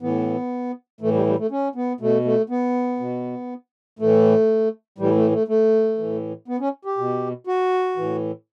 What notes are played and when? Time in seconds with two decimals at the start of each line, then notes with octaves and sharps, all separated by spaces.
0.01 A2 E3 B3
1.01 A2 E3 A3
1.14 G3
1.26 G3
1.38 A3
1.51 C#4
1.75 B3
2.00 B2 A3
2.25 A3
2.50 B3
3.00 B2
3.99 A2 E3 A3
4.98 A2 E3 G3
5.15 A3
5.31 A3
5.48 A3
5.98 A2 E3
6.48 B3
6.60 C#4
6.85 G4
6.98 B2
7.47 F#4
7.97 A2 E3